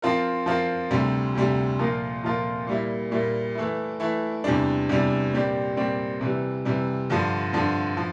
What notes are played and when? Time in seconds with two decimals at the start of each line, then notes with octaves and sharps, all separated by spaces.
0.02 F3 C4 F4 A#4
0.46 F3 C4 F4 A#4
0.91 D2 C3 G3
1.35 D2 C3 G3
1.79 A#2 F3 A#3 F4 A#4
2.23 A#2 F3 A#3 F4 A#4
2.67 A#2 G3 A#3 E4
3.11 A#2 G3 A#3 E4
3.55 E3 A3 E4
4.00 E3 A3 E4
4.44 E2 C3 G3 D4
4.89 E2 C3 G3 D4
5.33 A#2 G3 C4 G4 D5
5.76 A#2 G3 C4 G4 D5
6.21 C3 E3 G3
6.65 C3 E3 G3
7.10 G2 D3 F3
7.53 G2 D3 F3
7.97 F3